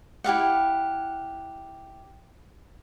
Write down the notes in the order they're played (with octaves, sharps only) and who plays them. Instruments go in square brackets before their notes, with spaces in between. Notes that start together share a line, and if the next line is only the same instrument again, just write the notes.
[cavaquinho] E4 G4 F5 F#5